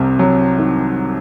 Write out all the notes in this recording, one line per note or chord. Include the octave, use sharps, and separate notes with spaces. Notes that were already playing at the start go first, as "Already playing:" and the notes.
Already playing: C2 C3
F#3
D#3